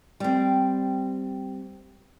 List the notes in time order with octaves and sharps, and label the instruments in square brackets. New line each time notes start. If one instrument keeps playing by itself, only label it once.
[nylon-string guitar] G3 C4